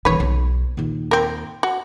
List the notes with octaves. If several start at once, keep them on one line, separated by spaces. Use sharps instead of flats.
D#1 E3 B4 C#5
B1
D#2 A#2
C4 A#4
F#4